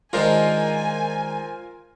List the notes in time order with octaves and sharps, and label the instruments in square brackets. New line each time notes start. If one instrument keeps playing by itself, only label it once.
[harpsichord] D#3 G#3 D4 [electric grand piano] F4 A#4 C5 [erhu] G#5